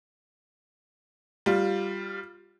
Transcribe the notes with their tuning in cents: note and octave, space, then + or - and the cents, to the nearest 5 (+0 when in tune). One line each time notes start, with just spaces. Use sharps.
G3 +0 F4 +5